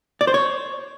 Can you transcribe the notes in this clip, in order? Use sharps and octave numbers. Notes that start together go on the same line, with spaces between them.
D5
C5
C#5